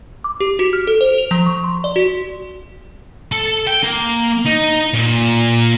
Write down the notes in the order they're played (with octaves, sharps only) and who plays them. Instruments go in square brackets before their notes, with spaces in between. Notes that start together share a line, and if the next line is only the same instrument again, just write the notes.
[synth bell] D6
G4
F#4
F6
A4
C5
F7
F3
C#6
C6
D5
F#4
[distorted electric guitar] A4
G5
A#3
D#4
A#2